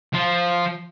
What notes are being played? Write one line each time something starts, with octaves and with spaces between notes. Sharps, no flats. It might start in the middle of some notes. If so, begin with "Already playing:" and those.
F3 F4